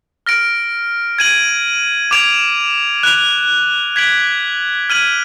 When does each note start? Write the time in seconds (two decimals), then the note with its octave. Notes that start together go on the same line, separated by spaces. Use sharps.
0.26 F6 A#6 D7
1.19 G#6 D#7 F#7
2.11 D6 G#6 D7 F7
3.03 F#6 D7 F7
3.96 G#6 B6 D7 F#7
4.90 F6 G#6 D#7 F#7